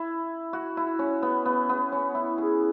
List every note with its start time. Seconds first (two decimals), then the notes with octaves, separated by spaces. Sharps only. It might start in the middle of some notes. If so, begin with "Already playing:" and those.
Already playing: E4
0.53 F#4
0.77 E4
0.99 C#4
1.22 B3
1.45 B3
1.69 B3
1.92 C#4
2.15 E4
2.38 G#4